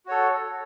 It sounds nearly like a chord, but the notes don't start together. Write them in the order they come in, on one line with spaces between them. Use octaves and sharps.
F#4 C#5 A4